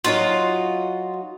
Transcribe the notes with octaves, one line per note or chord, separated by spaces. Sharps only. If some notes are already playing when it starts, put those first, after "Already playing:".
F#3 D#4 F4 F#4